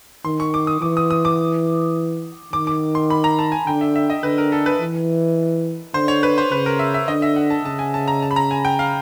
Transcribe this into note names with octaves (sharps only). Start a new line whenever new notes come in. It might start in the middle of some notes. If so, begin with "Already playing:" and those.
D#3 C6
C#6
D6
D#6
E3 D6
D#6
D#6
D6
D#3 D6
D6
C6
B5
A#5
A5
G#5
D3 G5
E5
E5
D#5
D3 B4
A#4
A4
B4
E3
D3 C5
C#5
B4
C5
C#3 B4
A#4
E5
E5
D3 D#5
E5
F#5
A5
C#3 A5
G#5
A5
A#5
A5
B5
A#5
G#5
G5
F5